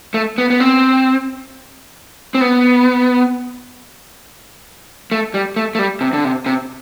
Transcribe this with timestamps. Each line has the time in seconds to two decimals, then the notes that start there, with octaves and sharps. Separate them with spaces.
0.14 A3
0.38 B3
0.50 B3
0.60 C4
2.35 C4
2.41 B3
5.12 A3
5.34 G3
5.56 A3
5.75 A3
5.79 G3
6.01 C3
6.13 D3
6.24 C3
6.46 C3